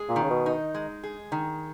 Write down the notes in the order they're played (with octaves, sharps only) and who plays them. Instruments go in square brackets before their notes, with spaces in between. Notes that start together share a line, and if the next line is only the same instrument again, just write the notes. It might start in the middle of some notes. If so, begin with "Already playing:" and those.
Already playing: [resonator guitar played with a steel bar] G#3 G#4
[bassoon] A#2
[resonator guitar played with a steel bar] D#3
[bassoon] C#3
B2
[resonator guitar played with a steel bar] D#4
G#3
G#4
D#3